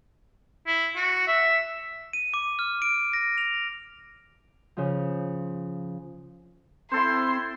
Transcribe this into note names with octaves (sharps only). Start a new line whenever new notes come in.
E4
F#4
E5
D#7
D6
F6
D7
A#6
F7
C#3 F3
C4 E4 A4 C5 C6